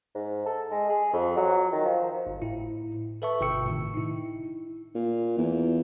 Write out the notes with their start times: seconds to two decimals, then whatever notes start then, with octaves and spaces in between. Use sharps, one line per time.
0.15 G#2
0.46 A4
0.71 G#3
0.89 G#4
1.13 F2
1.37 F#3
1.72 D#3
1.86 F3
2.27 G1
2.42 A2 E4
3.22 A4 B4 E5 A5 C#6
3.41 G1 B2 G5 C#6 E6 C#7
3.66 A2 C3 D#3
3.94 D#4 E4
4.95 A#2
5.38 E2